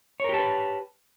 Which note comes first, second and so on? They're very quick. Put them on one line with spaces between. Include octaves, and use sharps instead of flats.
C#5 A#4 G4 A5 B4